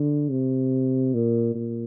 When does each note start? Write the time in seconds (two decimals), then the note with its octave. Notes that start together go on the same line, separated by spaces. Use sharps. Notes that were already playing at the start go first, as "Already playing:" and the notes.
Already playing: D3
0.31 C3
1.14 A#2
1.55 A#2